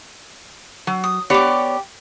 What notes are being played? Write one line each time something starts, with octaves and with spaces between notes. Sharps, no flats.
F#3
D#6
B3 G4 C#5 D5 D6